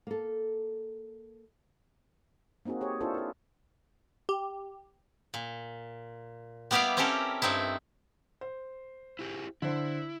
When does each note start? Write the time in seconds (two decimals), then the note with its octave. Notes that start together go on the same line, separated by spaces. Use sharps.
0.07 A#3 A4
2.65 A#3 C4 D#4 F#4 G#4
2.81 G4 G#4 C#5
3.00 D4 E4 F4 G#4 A4 C5
3.14 E4 A4
4.29 G4
5.34 A#2
6.71 G3 B3 E4 G4 D5 F5
6.97 C4 C#4 E4 G4 A4 A#4
7.42 G2 C4 D#4 E4
8.41 C5
9.19 E4 G4 G#4
9.62 D3 E4 C5